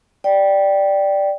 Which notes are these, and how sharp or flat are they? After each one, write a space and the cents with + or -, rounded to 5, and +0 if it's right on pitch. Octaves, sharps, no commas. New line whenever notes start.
D5 +0 G5 -5